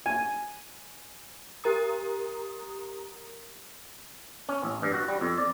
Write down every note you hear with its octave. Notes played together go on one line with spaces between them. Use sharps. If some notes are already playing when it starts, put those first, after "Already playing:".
G#5
G4 A#4 A#5 D#6
C#4
A1
G2
F#4
G3
F2
D5